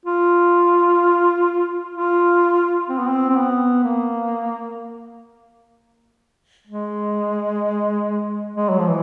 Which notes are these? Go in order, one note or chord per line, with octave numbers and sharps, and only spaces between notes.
F4
F4
C4
B3
C4
C4
B3
A#3
G#3
G#3
F#3
F3
E3